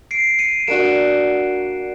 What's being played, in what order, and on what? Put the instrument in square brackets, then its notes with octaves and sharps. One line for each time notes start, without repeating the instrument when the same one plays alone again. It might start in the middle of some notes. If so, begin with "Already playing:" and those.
[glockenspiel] C7 D7
C#7 D#7
[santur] A#3 D4 F#4 [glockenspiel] D7 E7